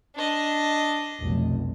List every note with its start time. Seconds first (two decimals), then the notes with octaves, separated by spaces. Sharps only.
0.15 D4 D#5
1.21 F1 B1